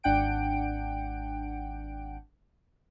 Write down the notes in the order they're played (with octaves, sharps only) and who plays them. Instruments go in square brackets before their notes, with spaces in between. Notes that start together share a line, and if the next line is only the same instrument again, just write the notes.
[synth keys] G#1 D4 F#5 G5 D7